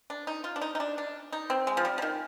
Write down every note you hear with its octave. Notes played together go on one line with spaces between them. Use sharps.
D4
D#4
F4
D4
D#4
D#4
D4
D4
D#4
C4
G#3
F3
G3
F3
D#3